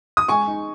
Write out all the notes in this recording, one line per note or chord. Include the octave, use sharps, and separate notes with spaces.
D#6
G#3 G#5 C#6
D#4